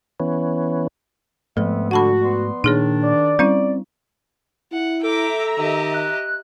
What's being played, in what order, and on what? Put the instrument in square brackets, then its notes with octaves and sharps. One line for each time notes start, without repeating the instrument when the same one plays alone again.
[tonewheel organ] E3 B3 C#4
[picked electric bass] G#2 A3 [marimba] F3 [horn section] B3 C4 E5
[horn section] D3 [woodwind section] F#4 [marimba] F#5 A5 B5
[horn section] B3 D5 C6
[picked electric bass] A#2 [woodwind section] D#3 D4 [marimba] D#4 G#4 C#5
[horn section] D5
[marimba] G3 C#4 E4 [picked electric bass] C4
[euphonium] E4 [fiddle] F#5
[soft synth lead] A4 [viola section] E5 A#5 [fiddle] G5 D6
[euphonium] D#3 [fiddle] G4 D#5
[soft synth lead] F#6